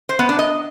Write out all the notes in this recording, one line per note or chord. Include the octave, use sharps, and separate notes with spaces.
C5
B3
D4
D#5